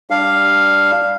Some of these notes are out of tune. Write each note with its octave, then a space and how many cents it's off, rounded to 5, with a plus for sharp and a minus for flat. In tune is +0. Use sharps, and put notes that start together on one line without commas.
G3 +0 D4 +0 F5 +0